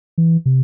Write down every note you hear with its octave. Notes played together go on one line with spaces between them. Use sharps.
E3
C3